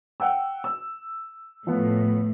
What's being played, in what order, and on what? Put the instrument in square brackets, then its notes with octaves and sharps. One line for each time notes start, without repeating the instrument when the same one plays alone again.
[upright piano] F#5 G5 E6
E6
[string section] A2 [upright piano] F3 B3